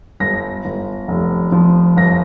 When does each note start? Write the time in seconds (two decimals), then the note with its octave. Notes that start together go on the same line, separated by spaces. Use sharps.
0.20 G1 A#6
0.65 G1
1.08 F1
1.52 F3
1.96 G1 A#6